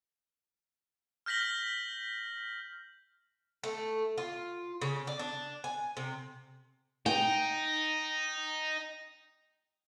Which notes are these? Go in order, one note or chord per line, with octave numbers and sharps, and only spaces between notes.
F6 G6 A#6 B6 F#7
A3
F4
C#3
D5
D4
G#5
C3
D#4 G5